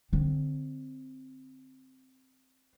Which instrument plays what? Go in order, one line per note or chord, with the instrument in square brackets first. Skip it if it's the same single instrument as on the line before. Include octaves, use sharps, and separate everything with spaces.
[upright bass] D3 C4